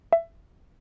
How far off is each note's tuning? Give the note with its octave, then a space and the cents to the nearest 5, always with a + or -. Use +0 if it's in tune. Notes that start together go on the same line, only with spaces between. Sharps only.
E5 +20